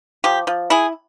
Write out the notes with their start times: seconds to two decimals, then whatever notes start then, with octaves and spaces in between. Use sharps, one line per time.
0.24 F3 G4
0.47 F3
0.70 E4 G#4